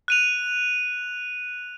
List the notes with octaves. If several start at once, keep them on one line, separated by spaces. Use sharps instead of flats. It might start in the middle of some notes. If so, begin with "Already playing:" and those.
F#6 D#7 F7